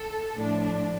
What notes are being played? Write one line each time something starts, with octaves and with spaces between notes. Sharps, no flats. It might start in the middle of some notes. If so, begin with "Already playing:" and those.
Already playing: A4
A2 F3 D4